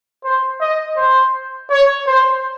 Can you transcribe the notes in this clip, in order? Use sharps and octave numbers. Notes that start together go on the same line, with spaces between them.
C5
D#5
C5
C#5
C5